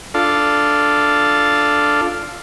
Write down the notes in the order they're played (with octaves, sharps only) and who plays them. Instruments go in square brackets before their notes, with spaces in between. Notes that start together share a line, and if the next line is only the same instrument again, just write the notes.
[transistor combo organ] D4 F4 A4